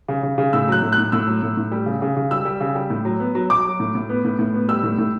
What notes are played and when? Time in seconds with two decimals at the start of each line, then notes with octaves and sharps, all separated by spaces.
0.09 C#3
0.23 C#3
0.38 C#3
0.53 A2 E6
0.68 F#3 F#6
0.82 A2
0.92 F#6
0.98 A2
1.12 A2 E6
1.27 F#3
1.42 A2
1.57 A2
1.72 G3
1.86 C#3
2.02 C#3
2.17 C#3
2.31 G3 E6
2.45 G3
2.61 C#3
2.75 G3
2.90 A2
3.05 F#3
3.20 B3
3.35 F#3
3.49 F#3 D6
3.65 F#3
3.80 A2
3.95 A2
4.09 B3
4.25 A2
4.39 A2
4.54 B3
4.68 G3 E6
4.83 A2
4.98 A2